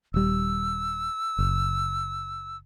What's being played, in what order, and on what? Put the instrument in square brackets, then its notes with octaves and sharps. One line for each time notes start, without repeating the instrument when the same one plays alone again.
[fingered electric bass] D#1 G3 [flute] E6
[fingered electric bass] F#1